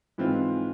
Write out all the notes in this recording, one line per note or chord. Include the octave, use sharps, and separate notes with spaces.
G#2 E3 G#3 C4 F4